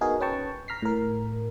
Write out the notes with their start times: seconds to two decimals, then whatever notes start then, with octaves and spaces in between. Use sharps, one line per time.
0.01 B3 D#4 F#4 G#4 A#4
0.20 C#4 B4 G5 A5 C#6
0.68 A#5 F6 B6 C7
0.82 A2 A#4